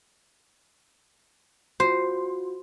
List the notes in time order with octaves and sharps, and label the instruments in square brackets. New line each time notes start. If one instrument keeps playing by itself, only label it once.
[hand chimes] F4 F#4 [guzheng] C5